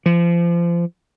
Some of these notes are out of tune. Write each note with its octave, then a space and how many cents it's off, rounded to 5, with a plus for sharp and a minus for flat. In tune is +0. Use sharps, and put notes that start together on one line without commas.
F3 -30